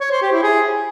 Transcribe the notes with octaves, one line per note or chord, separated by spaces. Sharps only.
C#5
C5
G4
E4
G#4